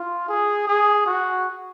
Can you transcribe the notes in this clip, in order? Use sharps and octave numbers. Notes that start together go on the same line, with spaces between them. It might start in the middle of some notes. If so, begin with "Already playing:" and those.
Already playing: F4
G#4
G#4
F#4